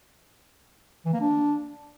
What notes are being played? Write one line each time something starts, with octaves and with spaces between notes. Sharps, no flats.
E3
A#3
D4